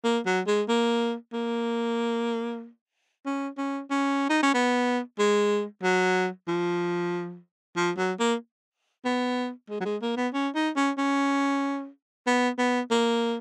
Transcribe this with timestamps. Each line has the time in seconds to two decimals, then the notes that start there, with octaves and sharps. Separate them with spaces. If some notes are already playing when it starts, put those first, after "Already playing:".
0.04 A#3
0.26 F#3
0.47 G#3
0.68 A#3
1.33 A#3
3.26 C#4
3.58 C#4
3.90 C#4
4.30 D#4
4.43 C#4
4.54 B3
5.19 G#3
5.83 F#3
6.48 F3
7.76 F3
7.97 F#3
8.19 A#3
9.05 B3
9.70 G#3
9.80 F#3
9.85 G#3
10.02 A#3
10.17 B3
10.33 C#4
10.55 D#4
10.76 C#4
10.98 C#4
12.27 B3
12.58 B3
12.91 A#3